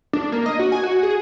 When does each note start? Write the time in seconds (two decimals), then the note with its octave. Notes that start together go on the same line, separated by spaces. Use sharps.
0.13 D4
0.32 A#3
0.46 D#5
0.59 F#4
0.72 G#5
0.83 F#4
1.03 G#4